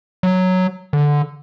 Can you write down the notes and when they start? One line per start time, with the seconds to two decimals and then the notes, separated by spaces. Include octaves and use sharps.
0.23 F#3
0.93 D3